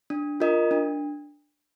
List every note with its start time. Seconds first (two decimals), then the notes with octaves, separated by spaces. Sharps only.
0.10 D4
0.40 F4 A#4 D#5
0.71 D4